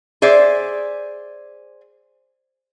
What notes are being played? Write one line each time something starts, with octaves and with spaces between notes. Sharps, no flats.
G#4 C5 D5 E5